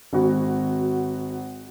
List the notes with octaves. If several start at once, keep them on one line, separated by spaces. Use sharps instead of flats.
G#1 F#4